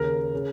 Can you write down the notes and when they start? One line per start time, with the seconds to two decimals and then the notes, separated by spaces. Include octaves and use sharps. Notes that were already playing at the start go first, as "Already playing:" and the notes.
Already playing: D#2 C#3 A#4
0.35 C#3